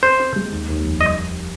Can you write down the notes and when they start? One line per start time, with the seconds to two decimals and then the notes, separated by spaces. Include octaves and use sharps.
0.03 C4 C5
0.20 C4
0.36 G#3
0.52 D#2
0.68 D#2
0.84 F1
1.01 G3 D#5